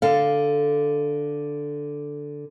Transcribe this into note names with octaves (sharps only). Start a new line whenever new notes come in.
D3 A4 F5